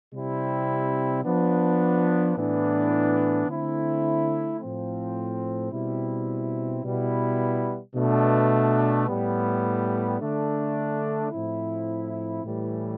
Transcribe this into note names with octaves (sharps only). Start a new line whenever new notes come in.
C3 G3 C4 E4
F3 B3 D4
A2 E3 B3 D4
D3 A3 C4 E4
A2 F3 C4
B2 G3 C4 E4
B2 G3 B3 E4
B2 A3 D4
A2 G3 B3
D3 A3 D4
A2 F3 C4 E4
A2 E3 G3